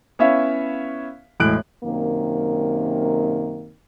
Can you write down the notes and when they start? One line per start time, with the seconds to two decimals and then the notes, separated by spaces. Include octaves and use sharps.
0.19 B3 C#4 E4 C#5 E5 F5
1.40 E1 A2 G#3 F#6 D7
1.84 F#2 C3 D#3 A#3